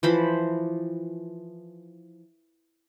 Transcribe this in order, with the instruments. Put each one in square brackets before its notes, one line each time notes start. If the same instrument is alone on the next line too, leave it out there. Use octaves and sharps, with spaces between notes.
[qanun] E3 F3 C5 B5